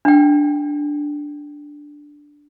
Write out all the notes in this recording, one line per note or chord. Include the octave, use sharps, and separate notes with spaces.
D4 G5